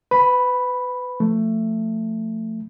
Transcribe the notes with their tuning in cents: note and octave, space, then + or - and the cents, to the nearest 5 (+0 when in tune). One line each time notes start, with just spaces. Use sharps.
B4 +25 B5 +0
F3 +0 A3 +15